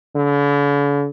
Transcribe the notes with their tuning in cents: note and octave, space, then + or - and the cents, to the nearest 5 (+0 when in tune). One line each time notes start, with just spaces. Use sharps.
D3 -45